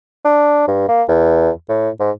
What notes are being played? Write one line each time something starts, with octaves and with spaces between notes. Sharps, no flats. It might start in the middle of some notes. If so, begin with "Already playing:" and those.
D4
G2
A#3
E2
A2
G#2